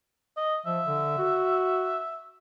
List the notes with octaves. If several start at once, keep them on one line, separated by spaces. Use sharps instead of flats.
D#5
F3 E5
D3
F#4